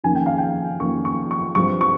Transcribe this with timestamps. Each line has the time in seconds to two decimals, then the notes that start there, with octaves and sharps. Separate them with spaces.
0.04 F2 D#3 A#3 C#4 G#5
0.15 G5
0.26 F5
0.38 G5
0.80 F2 D#3 A#3 C#4 C#6
1.05 C#6
1.31 C#6
1.55 G2 F3 C4 C#6
1.81 C#6